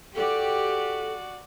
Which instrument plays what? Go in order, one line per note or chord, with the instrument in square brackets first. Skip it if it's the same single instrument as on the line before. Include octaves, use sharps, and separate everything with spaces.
[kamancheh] F#4 D5 [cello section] G4 [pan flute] A4